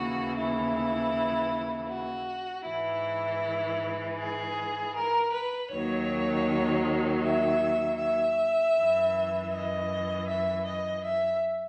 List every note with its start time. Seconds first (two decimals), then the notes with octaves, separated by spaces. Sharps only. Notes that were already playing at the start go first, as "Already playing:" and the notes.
Already playing: D#2 C#3 E3 F#4
0.37 E4
1.89 F#4
2.66 G#2 E3 E4
4.19 G#4
4.95 A#4
5.33 B4
5.71 D#2 D#3 F#3 C#5
7.24 E5
7.99 E5
8.77 F#2 E3
9.53 D#5
10.28 E5
10.67 D#5
11.05 E5